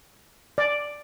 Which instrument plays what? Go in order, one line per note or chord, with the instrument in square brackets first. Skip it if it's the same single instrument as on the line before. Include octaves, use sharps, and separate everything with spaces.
[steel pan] D5